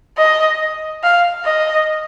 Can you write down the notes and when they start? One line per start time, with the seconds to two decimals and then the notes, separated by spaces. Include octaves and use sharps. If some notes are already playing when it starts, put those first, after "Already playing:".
0.18 D#5
1.03 F5
1.45 D#5